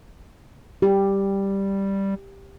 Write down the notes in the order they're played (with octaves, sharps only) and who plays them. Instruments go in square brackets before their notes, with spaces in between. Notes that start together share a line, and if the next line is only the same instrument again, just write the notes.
[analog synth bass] G3 [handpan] G4